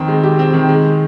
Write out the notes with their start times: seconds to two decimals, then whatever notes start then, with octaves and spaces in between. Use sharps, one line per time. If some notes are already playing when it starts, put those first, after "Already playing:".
Already playing: F2 D#3 C4
0.08 G#3
0.23 G4
0.39 C4
0.54 D#3
0.69 G#3